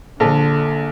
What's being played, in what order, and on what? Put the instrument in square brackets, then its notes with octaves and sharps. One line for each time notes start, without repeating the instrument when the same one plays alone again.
[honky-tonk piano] A#1 A4 [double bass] D3